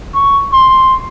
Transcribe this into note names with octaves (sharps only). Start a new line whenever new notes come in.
C#6
C6